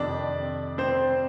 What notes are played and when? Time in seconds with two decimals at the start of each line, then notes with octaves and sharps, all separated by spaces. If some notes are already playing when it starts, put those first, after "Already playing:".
Already playing: F2 C3 D#3 D4 D5
0.78 C4 C5